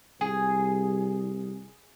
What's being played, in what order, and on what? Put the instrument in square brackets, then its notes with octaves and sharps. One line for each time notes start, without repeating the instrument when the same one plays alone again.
[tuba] C2 [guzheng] G#4